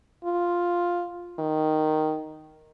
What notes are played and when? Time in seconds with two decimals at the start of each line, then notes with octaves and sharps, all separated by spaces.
0.25 F4
1.39 D#3